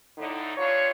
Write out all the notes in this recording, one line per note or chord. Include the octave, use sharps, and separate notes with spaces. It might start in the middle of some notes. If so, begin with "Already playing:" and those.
A2 D3 D#4
G2 D4 F4 C#5